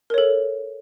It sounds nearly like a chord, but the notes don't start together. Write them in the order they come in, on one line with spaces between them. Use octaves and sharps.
A#4 C#5 A4